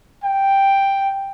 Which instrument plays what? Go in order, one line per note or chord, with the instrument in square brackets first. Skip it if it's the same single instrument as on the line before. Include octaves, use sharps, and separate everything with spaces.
[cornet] G5